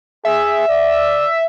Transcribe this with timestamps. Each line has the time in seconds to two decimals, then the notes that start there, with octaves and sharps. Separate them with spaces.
0.25 G#4 E5
0.68 D5